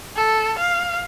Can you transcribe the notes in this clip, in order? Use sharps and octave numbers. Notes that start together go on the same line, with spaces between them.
A4
F5